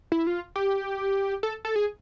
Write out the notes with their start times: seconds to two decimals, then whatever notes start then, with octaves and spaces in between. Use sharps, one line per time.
0.12 E4
0.27 F4
0.56 G4
1.43 A4
1.65 A4
1.76 G#4